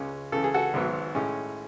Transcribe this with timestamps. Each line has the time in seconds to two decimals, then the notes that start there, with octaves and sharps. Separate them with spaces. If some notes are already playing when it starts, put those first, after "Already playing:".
Already playing: C#2 C#3 G#3 C#4
0.32 C#2 C#3 E3 A4
0.44 G#4
0.54 F#4 A4
0.74 G#1 G#2 F#3 B3
1.15 A2 G#3 C#4